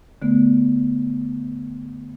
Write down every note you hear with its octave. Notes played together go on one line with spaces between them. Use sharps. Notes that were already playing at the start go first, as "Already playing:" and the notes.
D3 A3 B3